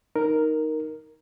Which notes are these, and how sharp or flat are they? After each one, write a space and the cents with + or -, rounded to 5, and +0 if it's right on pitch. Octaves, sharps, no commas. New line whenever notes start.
D#4 +0 A#4 +0